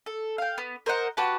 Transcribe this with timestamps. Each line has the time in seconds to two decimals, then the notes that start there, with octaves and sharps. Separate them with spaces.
0.06 A4
0.38 F5 G5
0.58 B3
0.86 A#4 C5 D#5 F#5
1.17 F#4 G4 B4 A5